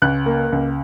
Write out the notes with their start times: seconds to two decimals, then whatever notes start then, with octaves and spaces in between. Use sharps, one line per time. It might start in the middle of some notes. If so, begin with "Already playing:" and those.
0.02 C#2 F#6
0.26 A#3
0.52 C#2